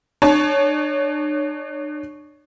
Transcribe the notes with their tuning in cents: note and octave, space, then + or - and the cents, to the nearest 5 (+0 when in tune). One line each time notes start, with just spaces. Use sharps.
D4 +45 C#5 +10 A5 -35